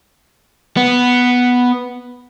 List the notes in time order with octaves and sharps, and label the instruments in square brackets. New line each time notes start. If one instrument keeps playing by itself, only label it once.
[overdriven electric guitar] B3